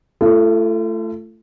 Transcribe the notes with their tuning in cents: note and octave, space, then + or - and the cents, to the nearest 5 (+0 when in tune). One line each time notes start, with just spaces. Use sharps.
A3 +5 F4 -40